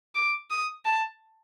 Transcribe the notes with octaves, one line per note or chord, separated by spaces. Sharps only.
D6
D#6
A5